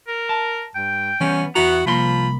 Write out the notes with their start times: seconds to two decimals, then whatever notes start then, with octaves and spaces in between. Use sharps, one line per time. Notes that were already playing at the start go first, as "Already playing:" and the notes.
0.08 A#4
0.29 A5
0.75 G2 G5
1.20 E3 G3 B3 C#4
1.55 E2 B3 E4 F#4 A#5
1.87 C2 F3 A#3 B5 C6